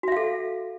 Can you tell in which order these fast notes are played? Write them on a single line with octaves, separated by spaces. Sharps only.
F#4 E5 F5 A4